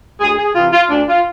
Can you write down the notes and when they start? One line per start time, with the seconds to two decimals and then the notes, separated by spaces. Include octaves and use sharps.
0.21 D2 G#4
0.38 G#4
0.55 C3 E3 F4
0.73 F4
0.90 D2 D4
1.08 F4